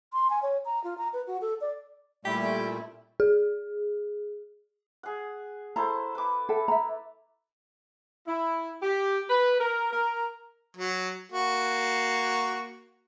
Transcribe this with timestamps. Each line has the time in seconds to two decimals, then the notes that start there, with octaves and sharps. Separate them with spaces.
0.13 C6
0.30 G#5
0.43 C#5
0.65 A#5
0.84 F4
0.98 A#5
1.13 B4
1.27 F#4
1.41 A4
1.61 D5
2.25 A#2 G3 A3 E4 G4
3.20 G#4
5.03 G#4 F#5
5.76 E4 A4 C5 A#5
6.15 B4 D6
6.49 A4 E5 G5
6.68 E5 A#5
8.28 E4
8.83 G4
9.28 B4
9.60 A#4
9.92 A#4
10.77 F#3
11.32 A#3 F#4